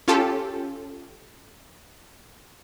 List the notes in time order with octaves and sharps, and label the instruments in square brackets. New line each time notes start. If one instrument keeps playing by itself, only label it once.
[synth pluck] C#4 F4 G4 A4